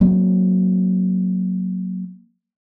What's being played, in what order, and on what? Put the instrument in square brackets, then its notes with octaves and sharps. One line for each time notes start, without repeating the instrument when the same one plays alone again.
[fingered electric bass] F#3 A#3 C4